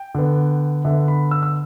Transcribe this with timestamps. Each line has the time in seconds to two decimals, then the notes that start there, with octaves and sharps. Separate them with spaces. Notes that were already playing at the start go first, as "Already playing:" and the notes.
Already playing: G5
0.15 D3 B3
0.85 D3 B3 E5
1.08 B5
1.31 E6
1.43 E6